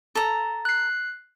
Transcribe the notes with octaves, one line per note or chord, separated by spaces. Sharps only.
A4 A#5
F#6 C7